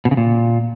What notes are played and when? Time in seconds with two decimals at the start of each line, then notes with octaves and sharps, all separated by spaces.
0.05 B2
0.11 C#3
0.17 A#2